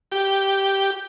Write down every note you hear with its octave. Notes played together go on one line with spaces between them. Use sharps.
G4